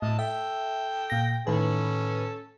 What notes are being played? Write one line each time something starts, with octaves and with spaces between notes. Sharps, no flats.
A2 D#5 A5
A4 E5 G5
A#2 A#6
A2 D#3 C#4 A4 B4